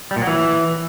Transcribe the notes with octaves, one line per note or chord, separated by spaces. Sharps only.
G3
A#2
F#3
E3